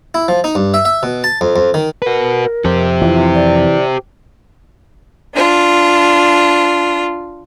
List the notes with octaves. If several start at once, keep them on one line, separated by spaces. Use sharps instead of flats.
E4
F3
D#4
G2
E5
E5
B2
A5
F2
F2
D#3
F#4 A#4 B4
F2 G4 C5
E3 F4
D5
D4 F4